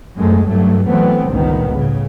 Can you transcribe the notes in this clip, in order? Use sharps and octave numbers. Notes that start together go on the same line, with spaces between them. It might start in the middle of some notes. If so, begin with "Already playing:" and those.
F#2 G#3 A3
G2 F#3 A3
E3 F#3 A3 B3 C4
G1 C#2 A#2 D#3 B3
A2 C#3